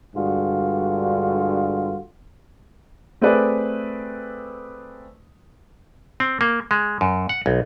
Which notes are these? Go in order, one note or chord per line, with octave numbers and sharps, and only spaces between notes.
G2 D3 G#3 F4 F#4
A3 C4 G#4 B4 D5
C4
A#3
G#3
F#2
F#5
B1